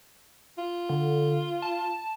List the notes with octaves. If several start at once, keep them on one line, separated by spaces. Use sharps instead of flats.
F4
D3
A5